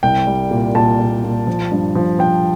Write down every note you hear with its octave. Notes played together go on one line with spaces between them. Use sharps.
C2 G5
G3
A#2
A#2 A5
A#2
A#2
F3
G2
F3
F3 G5